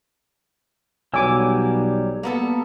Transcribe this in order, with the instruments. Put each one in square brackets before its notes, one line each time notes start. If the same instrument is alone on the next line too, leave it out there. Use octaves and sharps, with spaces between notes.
[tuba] B1 [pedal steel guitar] F#3 G3 E6 [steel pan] G#5 D6
[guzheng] A#3 B3 A4